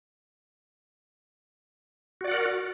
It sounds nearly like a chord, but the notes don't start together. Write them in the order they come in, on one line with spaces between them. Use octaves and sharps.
F#4 D5 F#5 A#4